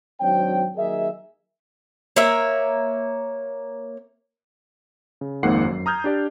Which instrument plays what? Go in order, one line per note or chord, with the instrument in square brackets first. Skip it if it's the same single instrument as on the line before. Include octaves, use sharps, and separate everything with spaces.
[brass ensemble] G#1 F#3 C4 D4 C#5 G5
D#2 F#3 G#4 A#4 D#5 E5
[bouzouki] A#3 C#5 E5
[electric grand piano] C#3
G#1 F2 G#2 A#3 F#5 C7
F#2
A#5 D#6 F6 G6 G#6
D4 G4 D5